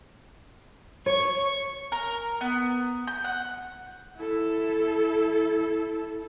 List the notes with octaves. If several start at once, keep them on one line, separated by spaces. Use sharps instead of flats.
C#5 C#6
A#4
B3
G6
F#5
E4 A4